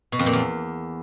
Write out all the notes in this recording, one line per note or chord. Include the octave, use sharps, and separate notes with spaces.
B2
F2
A#2
E2